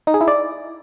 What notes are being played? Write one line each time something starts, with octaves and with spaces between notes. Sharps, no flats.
D#4
G#4
E4
D5